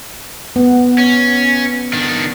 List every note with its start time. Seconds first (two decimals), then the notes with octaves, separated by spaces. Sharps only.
0.56 B3
0.98 C#4
1.93 D#3 D4